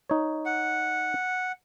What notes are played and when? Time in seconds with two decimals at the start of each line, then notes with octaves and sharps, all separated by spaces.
0.10 D#4 C#5
0.45 F#5